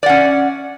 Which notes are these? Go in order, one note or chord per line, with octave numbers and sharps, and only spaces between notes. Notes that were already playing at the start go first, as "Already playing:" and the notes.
C#4 D5 F#5